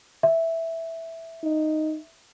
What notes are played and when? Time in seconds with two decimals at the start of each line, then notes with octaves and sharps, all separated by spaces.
0.23 E5
1.43 D#4